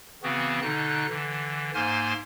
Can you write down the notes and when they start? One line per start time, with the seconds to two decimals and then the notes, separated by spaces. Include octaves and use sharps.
0.23 C#3 E3 B3 C4 F#4
0.62 B2 D3 D#4 F#6
1.10 D3 E3
1.74 G#2 A#3 C5 G#5 C6 F6